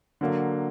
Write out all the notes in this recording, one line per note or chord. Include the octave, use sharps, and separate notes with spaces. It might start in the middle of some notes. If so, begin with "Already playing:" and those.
D3 F#3 A#3